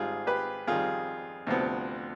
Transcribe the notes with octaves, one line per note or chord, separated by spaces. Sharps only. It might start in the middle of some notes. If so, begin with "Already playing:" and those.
Already playing: G#1 G#2 G3 F4 G#4
G4 B4
F2 D#3 G3 F4 G#4
D2 C3 F3 B3